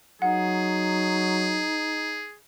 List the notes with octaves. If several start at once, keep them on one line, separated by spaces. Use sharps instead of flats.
F#3 D#4 G#4 F#5